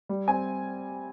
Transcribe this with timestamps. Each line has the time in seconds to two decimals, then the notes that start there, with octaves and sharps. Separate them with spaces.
0.09 G3
0.28 C4 G#5